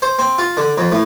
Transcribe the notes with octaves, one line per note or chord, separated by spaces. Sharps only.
C5
C4
F4
D3
F2
A2